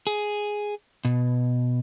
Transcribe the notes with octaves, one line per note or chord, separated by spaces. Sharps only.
G#4
B2